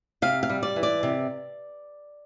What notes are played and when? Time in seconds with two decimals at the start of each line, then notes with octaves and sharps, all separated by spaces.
0.22 C3 F5
0.43 F5
0.49 G3
0.63 D5
0.76 E3
0.83 D5
1.03 C3